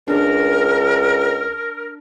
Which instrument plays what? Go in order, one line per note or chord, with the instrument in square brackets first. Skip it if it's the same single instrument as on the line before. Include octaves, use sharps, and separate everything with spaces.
[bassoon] C#2 [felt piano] D4 [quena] A#4